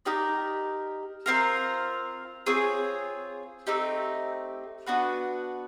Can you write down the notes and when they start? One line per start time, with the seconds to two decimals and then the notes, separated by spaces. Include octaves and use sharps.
0.05 D#4 G4 A#4 D5
1.26 C4 F4 A#4
2.46 C4 F4 G#4 C#5
3.67 A3 C4 D#4 G4
4.86 B3 D4 F#4 B4